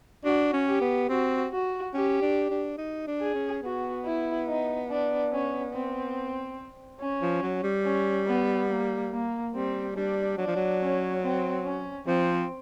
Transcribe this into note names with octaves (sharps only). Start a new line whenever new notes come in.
D4 F#4
C#4
G4
B3
C4 F#4
F#4
C#4 G4
D4
D4
D#4
D4
G#4
C#4
B3 F#4
E4
D#4
D4
C#4
C4
C#4
F3
F#3
G3
C#4
B3
A#3
A#3
G3 C4
G3 D4
F#3 D4
F3
F#3
C#4
C4
C#4
F3 C4